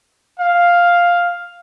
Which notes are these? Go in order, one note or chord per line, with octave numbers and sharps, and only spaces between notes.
F5